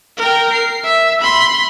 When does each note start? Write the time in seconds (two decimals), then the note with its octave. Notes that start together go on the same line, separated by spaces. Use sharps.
0.18 A#4 G5
0.53 C7
0.85 E5
1.22 B5 C6